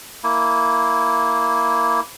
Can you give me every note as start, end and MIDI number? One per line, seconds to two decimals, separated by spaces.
0.24 2.01 58
0.24 2.01 64